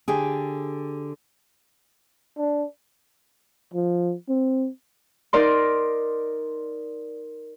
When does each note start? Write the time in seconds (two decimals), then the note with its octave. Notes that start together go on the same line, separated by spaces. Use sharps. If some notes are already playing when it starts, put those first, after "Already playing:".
0.08 D3 G4 G#4
2.38 D4
3.74 F3
4.29 C4
5.33 D#4 A#4 D5 C6